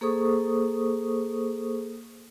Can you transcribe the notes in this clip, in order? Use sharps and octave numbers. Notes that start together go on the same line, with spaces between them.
A#3 G#4 A4 C5 C#6 D#6